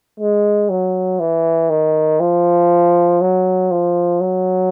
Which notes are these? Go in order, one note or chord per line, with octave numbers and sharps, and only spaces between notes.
G#3
F#3
E3
D#3
F3
F#3
F3
F#3